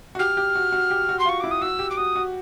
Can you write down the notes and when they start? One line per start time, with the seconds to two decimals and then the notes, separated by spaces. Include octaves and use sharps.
0.15 F#4
0.19 G4 F6
0.37 G4
0.55 F#4
0.72 F#4
0.91 G4
1.09 F#4
1.19 C6
1.25 F4 C#6
1.40 E4 D6
1.51 D#6
1.61 F#4 E6
1.79 G4
1.90 D6
1.97 F#4 D#6
2.16 F#4